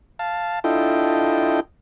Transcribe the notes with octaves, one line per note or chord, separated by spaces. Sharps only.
F5 A5
D4 E4 F4 A4 D#5 G5